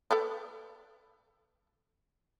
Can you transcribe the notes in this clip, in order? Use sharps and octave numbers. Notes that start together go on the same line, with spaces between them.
A4 B4 D5